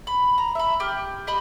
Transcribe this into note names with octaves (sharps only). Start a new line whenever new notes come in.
B5
A#5
E5 B5
G4 F6
G4 D#5 B5